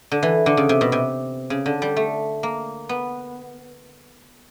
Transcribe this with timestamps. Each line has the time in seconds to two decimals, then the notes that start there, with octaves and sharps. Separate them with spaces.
0.11 D3
0.23 E3
0.46 D3
0.57 C#3
0.69 C3
0.81 B2
0.92 C3
1.50 C#3
1.66 D3
1.82 G3
1.97 A3
2.43 A#3
2.89 B3